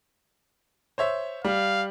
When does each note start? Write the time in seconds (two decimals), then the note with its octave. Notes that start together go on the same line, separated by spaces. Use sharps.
0.98 C5 C#5 E5
1.45 G3 F5